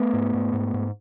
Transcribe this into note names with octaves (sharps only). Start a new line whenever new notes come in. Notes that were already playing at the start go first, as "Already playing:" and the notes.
Already playing: A3 B3
G#2
G#2
G#2
G#2